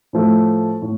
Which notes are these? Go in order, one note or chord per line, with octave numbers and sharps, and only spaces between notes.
A2 F3 A3
A2